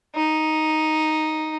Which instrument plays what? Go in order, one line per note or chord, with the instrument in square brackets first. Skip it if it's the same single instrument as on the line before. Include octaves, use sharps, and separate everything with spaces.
[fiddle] D#4